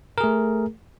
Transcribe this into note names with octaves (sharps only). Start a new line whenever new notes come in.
A3 G#4 A#4